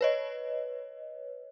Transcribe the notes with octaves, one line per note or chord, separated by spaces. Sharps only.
B4 C#5 D#5